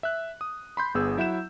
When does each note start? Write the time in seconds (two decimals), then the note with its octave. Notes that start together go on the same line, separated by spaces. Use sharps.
0.03 E5 F#6
0.41 D#6
0.77 B5 C6 G6
0.95 G1 B3 G#4 E6
1.17 F#3 E4 E5 F#5 G6 E7